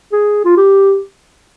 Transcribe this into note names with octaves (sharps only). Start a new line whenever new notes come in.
G#4
F4
G4